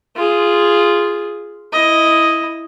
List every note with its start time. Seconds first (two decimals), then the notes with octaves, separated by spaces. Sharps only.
0.16 F4 G#4
1.73 E4 D#5